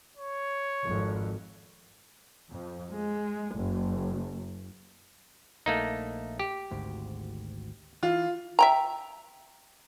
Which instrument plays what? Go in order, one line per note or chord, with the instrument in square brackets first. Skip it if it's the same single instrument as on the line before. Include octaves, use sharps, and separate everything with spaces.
[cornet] C#5
[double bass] G#1 F2
[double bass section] F2
G#3
F#1
[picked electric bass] A#1 [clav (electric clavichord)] A3 A#3 D#4
[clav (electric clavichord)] G4
[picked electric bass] G#1 D2 G#2
[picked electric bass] E3 [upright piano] F4
[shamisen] E5 G5 A#5